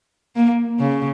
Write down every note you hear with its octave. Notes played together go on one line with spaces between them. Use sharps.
A#3
C#3